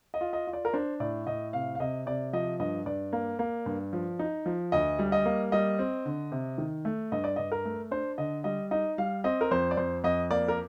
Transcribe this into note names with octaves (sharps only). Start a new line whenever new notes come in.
D#5
F4
D#5
F4
D5
A#4
D4 C5
A2 D5
A2 D#5
C3 F5
F5
C3 D#5
C3 D5
F3 D#5
G2 D#5
G2 D5
A#3
A#3
G2
F3
D#4
F3
D2 D#5
G3
D#5
A#3
G3 D#5
C4
D3
C3
D#3
A3
G2 D#5
D5
G2 D#5
A#4
A3
D4 C5
D3 D#5
G3 D#5
D#4 D#5
G3 F5
C4 D#5
A#4
F2 C5
D5
F2 C5
F2 D#5
A#3 D5
A#4